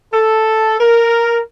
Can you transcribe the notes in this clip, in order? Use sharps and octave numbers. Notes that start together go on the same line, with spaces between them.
A4
A#4